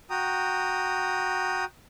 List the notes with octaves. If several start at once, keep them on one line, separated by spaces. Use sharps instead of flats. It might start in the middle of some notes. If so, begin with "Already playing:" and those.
F#4 G5 A#5 D#6